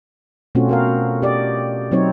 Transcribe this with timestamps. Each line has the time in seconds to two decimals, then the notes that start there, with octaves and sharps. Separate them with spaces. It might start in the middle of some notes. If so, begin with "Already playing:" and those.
0.55 B2 A3 C4 C#4 F4 F#4
0.69 F#4 A#4 F5
1.22 G4 D5 D#5
1.92 F#3 C4 D#4 C#5